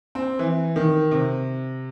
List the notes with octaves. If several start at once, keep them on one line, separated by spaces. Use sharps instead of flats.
C4
E3
D#3
C3